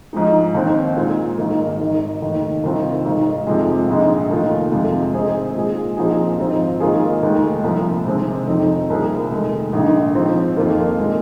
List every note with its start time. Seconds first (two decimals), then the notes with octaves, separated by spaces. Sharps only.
0.13 G#2 F3 G#3 D#4
0.54 D#2 D#3 C4
0.96 A#2 G#3 D#4
1.38 G#1 G#2 D#3 A#3
1.79 G#1 G#2 D#3
2.21 F1 D#2 D#3
2.63 C2 C3 D#3 C4 F4
3.05 G#1 G#2 D#3
3.47 F2 C3 F3 G#3
3.88 A#1 G#2 G#3
4.29 F1 D#2 D#3 A#3 F4
4.72 F2 C3 G#3 F4
5.13 G#2 D#3 C4 G#4
5.55 A#2 G#3 F4 G#4
5.97 A#2 F3 C4 D#4 G#4
6.39 G#1 G#2 F3 C4 F4
6.80 G#2 D#3 A#3 F4 G#4
7.22 F1 D#2 D#3 G#3
7.64 C2 A#2 F3
8.06 C2 C3 D#3 G#3 C4
8.47 F2 D#3 C4 D#4
8.90 C2 A#2 A#3 G#4
9.31 F1 D#2 D#3 G#3
9.73 A#1 G#2 D#3
10.14 G#2 F3 C4
10.57 F2 D#3 A#3 F4
10.98 A#2 G#3